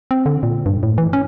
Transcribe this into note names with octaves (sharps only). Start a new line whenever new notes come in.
C4
D3
A#2
G2
A2
E3
C#4